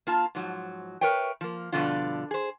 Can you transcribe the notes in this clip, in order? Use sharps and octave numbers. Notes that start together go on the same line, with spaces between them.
A#3 F4 A5
G#2 F3 F#3
A#4 B4 C#5 E5 G5
F3 A#3
G2 B2 D3 F3 D4 F4
G#4 C5